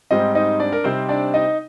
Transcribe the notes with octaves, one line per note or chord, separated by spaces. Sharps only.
G#2 G3 C4 D#4 D#5
D#4 D#5
D4 D5
A#4
C3 G3 C4 D#4 C5
D4 D5
D#4 D#5